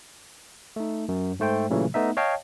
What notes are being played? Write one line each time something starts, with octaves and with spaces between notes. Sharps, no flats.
A3 D#4
F#2
G#2 A3 C5 G5
A#2 C#3 E3 F#3 A3
A3 B3 D#4 E5
C#5 D#5 F5 G5 A5